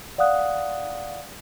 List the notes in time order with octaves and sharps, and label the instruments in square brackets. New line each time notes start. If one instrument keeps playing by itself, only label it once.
[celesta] D5 F5 F#5 D#6 F#6